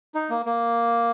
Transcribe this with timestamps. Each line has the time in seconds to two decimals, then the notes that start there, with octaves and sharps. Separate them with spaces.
0.15 D#4
0.30 A#3
0.46 A#3